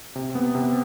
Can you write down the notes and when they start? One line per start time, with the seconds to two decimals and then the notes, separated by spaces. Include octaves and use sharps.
0.15 C3
0.35 B3
0.55 C3